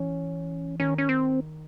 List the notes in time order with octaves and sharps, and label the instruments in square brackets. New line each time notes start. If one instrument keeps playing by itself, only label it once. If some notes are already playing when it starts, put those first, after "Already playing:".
Already playing: [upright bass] E3 [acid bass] C#4
[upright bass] D#3 [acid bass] C#4
[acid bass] C#4
C4